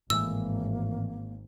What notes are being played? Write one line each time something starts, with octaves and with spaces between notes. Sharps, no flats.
G#1 A2 E3 G#3 A#3 E6